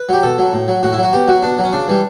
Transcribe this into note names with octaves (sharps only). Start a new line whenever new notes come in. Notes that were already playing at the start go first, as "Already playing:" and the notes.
Already playing: B4
F#3 G4
B2 A4
F#3
A2
F#3
A2 F#4
E4
F#3
F#4
B2 G4
F#3 F#4
B2 D4
F#3
C#4
C#3 D4
E3 G3